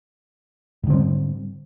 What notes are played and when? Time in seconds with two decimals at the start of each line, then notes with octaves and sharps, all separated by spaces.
0.83 G#2
0.87 D3
0.90 C4
0.93 G3